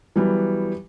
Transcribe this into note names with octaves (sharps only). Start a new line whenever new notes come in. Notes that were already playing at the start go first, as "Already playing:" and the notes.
E3 F#3 G3 B3